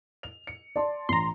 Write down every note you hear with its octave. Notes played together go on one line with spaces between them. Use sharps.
F7
C#7
D5 A5 C6
A1 A#5 C6